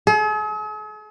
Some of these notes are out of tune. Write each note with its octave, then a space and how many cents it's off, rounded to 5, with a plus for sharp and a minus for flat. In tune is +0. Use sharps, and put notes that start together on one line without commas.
G#4 +45